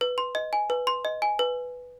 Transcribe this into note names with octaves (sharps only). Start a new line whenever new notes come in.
B4
C6
D#5
G#5
B4
C6
D#5
G#5
B4